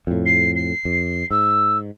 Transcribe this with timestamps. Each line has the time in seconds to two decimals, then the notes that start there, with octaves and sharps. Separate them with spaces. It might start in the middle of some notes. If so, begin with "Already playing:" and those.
0.07 F2 A2
0.26 C7
0.55 C7
0.85 F2
1.31 G#2 E6